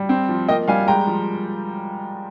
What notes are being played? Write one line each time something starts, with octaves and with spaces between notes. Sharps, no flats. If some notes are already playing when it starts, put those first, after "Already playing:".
Already playing: G3
C4
F3
A#3 D#5 G5
G3 F5 G#5
G#3 G5 A#5
F3